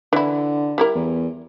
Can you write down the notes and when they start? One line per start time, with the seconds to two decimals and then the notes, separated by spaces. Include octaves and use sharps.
0.13 D3 E3 E4
0.78 G3 E4 A#4
0.95 E2